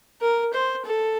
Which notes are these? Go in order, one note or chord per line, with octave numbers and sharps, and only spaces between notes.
A#4
C5
A4